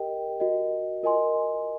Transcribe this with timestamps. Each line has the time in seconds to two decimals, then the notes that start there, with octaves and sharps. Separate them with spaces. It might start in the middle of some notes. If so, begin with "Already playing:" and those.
Already playing: G4 A#4 D#5 G5
0.40 F#4 A#4 D#5
1.03 F4 A#4 D#5 G#5 C6